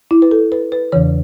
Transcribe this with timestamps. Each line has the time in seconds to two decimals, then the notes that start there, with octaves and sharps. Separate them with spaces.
0.11 E4
0.22 B4
0.31 A4
0.52 B4
0.72 B4
0.92 E2 C#3 E3 C#5